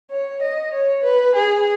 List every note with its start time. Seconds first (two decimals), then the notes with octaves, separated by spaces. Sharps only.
0.12 C#5
0.42 D#5
0.74 C#5
1.04 B4
1.35 G#4